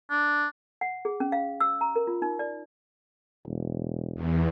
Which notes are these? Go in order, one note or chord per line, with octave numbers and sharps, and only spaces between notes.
D4
F#5
G#4
C#4
F5
E6
A#5
A#4
F4
D#4
D5
E1
E2